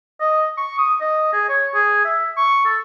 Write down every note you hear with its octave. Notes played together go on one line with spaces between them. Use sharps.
D#5
C#6
D#6
D#5
G#4
C#5
G#4
E5
C#6
A4